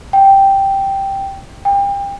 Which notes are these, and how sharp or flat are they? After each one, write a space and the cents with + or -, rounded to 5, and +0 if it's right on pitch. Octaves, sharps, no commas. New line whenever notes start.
G5 +0
G5 +30